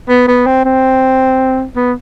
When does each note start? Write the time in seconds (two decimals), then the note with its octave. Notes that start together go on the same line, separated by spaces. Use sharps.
0.09 B3
0.28 B3
0.46 C4
0.65 C4
1.76 B3